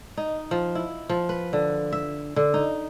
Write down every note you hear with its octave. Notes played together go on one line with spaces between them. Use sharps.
D#4
F3
E4
F3
B4
D3
E5
D3
D#4